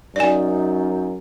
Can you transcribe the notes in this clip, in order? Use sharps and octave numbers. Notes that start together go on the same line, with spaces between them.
F#2 D#4 D5 G#5